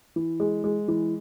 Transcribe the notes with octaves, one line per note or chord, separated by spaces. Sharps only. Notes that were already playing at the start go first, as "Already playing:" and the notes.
E3
G#3
G#3
E3